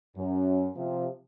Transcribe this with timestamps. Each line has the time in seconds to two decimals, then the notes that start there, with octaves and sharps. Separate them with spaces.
0.16 F#2
0.76 C3 F3